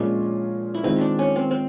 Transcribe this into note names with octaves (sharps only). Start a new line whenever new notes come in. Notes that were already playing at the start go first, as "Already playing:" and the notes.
Already playing: A#2 F3 G#3 C#4 D4 F4
E4
D#3 G#3 C4 D#4 F4
D4
C#4
C4
C4